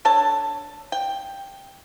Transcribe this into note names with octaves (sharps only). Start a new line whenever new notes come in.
D4 A4 C#5 A5
G5